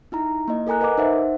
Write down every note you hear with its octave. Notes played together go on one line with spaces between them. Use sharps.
D#4 E4 A#5
A#3 E4 D#5
A4 A#4 G#5 A#5 F#6
A#4 B4 D#5 F#5 D6
D#4 C5 E5 F#5